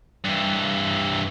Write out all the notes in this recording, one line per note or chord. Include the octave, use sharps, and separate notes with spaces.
G2 E3